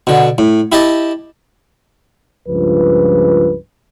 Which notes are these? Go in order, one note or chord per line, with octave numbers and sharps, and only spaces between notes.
B2 D3
A2
E4 G4 D#5 A5
C#2 G2 F3 B4